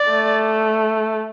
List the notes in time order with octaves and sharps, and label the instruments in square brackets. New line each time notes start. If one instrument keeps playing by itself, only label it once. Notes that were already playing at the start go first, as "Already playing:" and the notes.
Already playing: [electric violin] D5
[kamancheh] A3